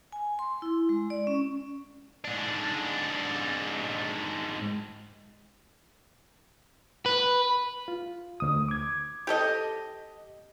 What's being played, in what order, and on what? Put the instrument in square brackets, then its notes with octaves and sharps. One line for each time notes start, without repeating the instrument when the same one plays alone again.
[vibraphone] G#5
C6
E4
G#3
D5
C#4
[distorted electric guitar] G#2 D4
[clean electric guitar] B4
[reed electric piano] F4
D2 D#6
D6 G#6
[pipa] G4 A4 D#5